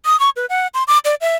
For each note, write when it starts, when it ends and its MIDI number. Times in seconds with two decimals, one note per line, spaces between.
0.05 0.19 87
0.20 0.30 85
0.36 0.46 71
0.50 0.67 78
0.74 0.83 84
0.88 0.98 86
1.05 1.15 74
1.21 1.36 76